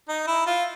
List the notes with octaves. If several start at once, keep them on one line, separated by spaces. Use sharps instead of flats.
D#4
E4
F4